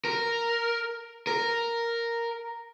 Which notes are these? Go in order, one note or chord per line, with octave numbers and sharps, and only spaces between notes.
A#4
A#4